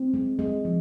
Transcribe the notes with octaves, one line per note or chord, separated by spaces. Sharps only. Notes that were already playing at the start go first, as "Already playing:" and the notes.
Already playing: C4
G#3
G#3
F3